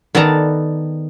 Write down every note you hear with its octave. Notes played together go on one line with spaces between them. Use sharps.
D#3 B3 A4 D5 A5 A#5